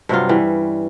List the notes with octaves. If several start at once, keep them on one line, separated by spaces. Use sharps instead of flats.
G2 C3 F#3 F4
E3 G3 C#4